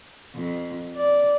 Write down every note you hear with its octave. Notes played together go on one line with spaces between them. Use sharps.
F2
D5